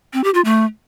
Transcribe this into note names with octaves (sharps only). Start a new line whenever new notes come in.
C4
G4
F4
A3